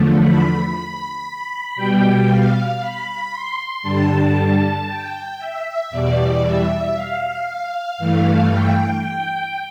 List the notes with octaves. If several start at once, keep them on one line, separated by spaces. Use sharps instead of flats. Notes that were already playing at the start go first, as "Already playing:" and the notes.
Already playing: E2 D3 F3 A3
B5
B2 G3 G5
F5
B5
C6
G2 D3 G3 A5
G5
E5
E2 B2 G3 D5
E5
F5
G2 E3 A3
G5
G5